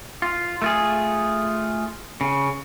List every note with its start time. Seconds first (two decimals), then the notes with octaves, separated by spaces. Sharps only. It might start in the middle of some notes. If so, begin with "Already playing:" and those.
0.22 F4
0.62 A3 F4 G#4
2.21 C#3